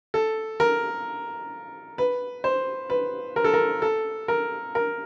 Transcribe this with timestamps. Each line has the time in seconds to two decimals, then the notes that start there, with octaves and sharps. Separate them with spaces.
0.14 A4
0.60 A#4
1.98 B4
2.44 C5
2.90 B4
3.36 A#4
3.44 A4
3.54 A#4
3.82 A4
4.28 A#4
4.75 A#4